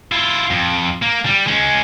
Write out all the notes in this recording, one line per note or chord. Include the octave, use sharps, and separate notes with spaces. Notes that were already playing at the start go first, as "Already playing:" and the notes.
E4 F4
F2
A#3
G3
G#3 C#4